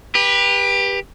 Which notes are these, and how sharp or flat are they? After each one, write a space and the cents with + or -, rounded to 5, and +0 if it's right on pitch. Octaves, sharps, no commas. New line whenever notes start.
G4 +20 B4 -20